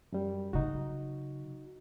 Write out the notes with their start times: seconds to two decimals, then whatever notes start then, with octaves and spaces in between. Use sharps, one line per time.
0.12 F#2 G3
0.53 C#3 F#3 D#4 F#4